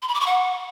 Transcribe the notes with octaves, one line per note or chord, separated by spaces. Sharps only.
C6
B5
D6
C#6
F#5